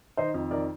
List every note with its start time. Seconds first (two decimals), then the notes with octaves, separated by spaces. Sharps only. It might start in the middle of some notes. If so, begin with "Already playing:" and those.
0.17 D#3 C5 D#5
0.34 F2
0.51 D#3 A#4 D5